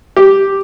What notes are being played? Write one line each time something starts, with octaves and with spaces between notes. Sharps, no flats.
G4